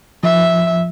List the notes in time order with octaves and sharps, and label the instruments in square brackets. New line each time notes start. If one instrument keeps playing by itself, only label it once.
[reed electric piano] F3 [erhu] E5